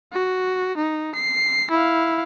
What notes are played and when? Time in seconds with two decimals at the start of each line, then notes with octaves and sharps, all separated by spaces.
0.12 F#4
0.77 D#4
1.15 C7
1.71 E4 F5